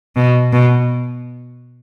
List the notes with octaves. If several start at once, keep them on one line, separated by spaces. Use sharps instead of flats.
B2
B2